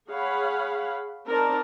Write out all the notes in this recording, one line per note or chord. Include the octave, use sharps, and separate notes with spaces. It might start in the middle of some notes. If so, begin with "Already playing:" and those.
G#4 C#5 F5 F#5 B5
C4 D#4 A#4 D5 A5